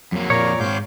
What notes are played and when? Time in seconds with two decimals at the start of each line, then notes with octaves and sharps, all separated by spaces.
0.12 F2 F#3 A#3
0.30 A#2 A#4 C#5 D5 A#5
0.60 G#2 C4 F5 D6 G6